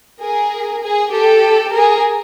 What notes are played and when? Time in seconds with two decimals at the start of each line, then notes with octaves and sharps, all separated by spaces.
0.19 G#4 A#4
0.81 G#4
1.11 G4 A4
1.73 G#4 A#4